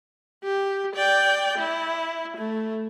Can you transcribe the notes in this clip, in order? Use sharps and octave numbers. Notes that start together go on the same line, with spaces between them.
G4
D5 G5
E4
A3